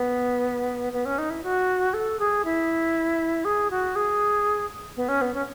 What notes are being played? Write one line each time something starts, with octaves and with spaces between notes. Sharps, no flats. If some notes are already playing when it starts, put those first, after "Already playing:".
Already playing: B3
B3
C#4
D#4
E4
F#4
A4
G#4
E4
G#4
F#4
G#4
B3
C#4
B3
C#4